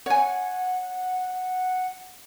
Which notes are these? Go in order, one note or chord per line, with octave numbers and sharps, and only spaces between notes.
C#5 F#5 G#5